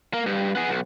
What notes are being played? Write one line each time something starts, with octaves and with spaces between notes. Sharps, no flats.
A#3
G2
B3 G#4
B1